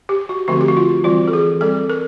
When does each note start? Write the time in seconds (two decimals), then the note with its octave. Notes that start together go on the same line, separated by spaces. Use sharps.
0.09 G4
0.29 F#4
0.48 D3 F3 A3 C4 F#4
0.61 G4
0.68 F#4
0.77 F4
1.04 E3 G3 C4 F4
1.28 A4
1.33 G#4
1.61 G3 C4 A4
1.90 A#4